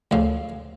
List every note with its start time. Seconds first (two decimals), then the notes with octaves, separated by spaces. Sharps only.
0.11 D2 C#3 F3 F5